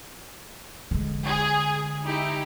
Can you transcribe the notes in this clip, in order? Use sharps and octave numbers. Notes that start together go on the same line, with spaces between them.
D3 G#3
G#4
D#4 E4 G4